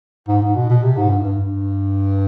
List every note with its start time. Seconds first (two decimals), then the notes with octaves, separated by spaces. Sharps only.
0.28 G#2
0.42 G#2
0.56 B2
0.70 B2
0.82 C3
0.97 G#2
1.10 G2
1.25 G2
1.38 G2